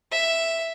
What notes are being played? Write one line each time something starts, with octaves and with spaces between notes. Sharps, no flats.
E5